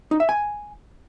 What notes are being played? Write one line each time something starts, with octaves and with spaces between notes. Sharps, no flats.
D#4
E5
G#5